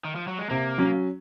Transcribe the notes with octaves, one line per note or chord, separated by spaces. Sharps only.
D#3
F3
F#3
G#3
C3 A#3
F#3 C#4